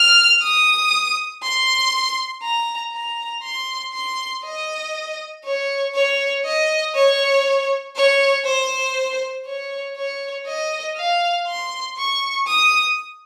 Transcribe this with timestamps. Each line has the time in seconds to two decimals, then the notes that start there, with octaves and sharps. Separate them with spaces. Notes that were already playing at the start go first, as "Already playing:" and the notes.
Already playing: F6
0.42 D#6
1.43 C6
2.42 A#5
2.93 A#5
3.43 C6
3.94 C6
4.44 D#5
5.44 C#5
5.94 C#5
6.45 D#5
6.95 C#5
7.95 C#5
8.46 C5
9.46 C#5
9.96 C#5
10.47 D#5
10.97 F5
11.47 C6
11.97 C#6
12.47 D#6